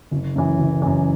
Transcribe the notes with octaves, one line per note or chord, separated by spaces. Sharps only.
F#1
F#2 E3
F#1
F#2 E3